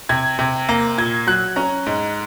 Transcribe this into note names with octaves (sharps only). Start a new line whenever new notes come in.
C3 G#6
C3
A#3
A#2 G#6
F#3 F#6
C#4 A#5
G#2